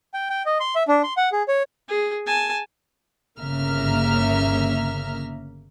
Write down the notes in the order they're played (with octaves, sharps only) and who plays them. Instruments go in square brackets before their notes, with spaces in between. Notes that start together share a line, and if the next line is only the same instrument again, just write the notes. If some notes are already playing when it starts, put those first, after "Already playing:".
[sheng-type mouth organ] G5
G5
D#5
C6
E5
D4
C6
F#5
G#4
C#5
[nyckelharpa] G#4
G#5 A5
[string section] G1 C#3 A#3 E5 A#5 F6